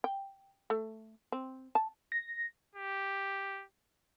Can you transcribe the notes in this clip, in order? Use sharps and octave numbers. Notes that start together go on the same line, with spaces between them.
G5
A3
C4
A5
A#6
G4